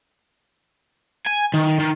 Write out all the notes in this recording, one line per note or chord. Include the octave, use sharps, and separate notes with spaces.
G#5
D#3
D#3